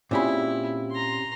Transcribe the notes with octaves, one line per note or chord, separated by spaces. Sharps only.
A#2 C4 C#4 E4 G4 G#4 B5
A#5 C6